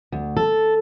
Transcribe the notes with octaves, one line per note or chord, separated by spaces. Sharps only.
D2
A4